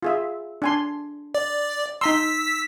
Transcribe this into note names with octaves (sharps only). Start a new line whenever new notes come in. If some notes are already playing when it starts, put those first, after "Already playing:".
F4 G#4 E5
D4 G#5 C6
D5
D#4 A#5 C6 E6 B6